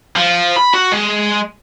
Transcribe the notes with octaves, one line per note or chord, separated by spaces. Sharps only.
F3
B5
F#4
G#3